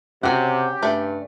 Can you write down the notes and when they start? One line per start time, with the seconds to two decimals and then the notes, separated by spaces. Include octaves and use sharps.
0.23 C3 C#4 F#4 G4 F#5
0.83 G2 A3 D5